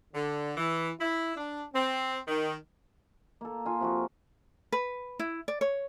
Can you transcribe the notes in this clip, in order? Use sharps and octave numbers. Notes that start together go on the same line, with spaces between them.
D3
E3
E4
D4
C4
D#3
A#3 A4
F4 G#5
C3 F3 F#4
B4
E4
D5
C#5